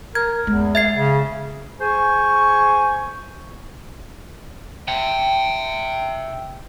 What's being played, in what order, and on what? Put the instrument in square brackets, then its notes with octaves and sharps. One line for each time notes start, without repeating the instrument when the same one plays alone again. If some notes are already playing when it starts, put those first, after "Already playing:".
[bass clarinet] A#4 [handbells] G#6
[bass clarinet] E2 [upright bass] G#3
[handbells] E5 G#6 C7
[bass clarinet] C#3
[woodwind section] G#4 C5 G#5 C#6
[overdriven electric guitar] E5 G5